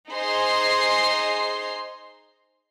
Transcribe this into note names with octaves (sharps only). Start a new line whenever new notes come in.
D#4 G#4 C5 C6 C7